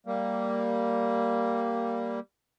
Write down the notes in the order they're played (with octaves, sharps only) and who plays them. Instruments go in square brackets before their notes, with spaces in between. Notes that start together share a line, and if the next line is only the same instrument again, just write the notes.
[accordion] G3 A#3